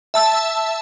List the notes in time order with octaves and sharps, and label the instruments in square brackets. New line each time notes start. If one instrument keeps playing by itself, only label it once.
[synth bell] E5 A5 E6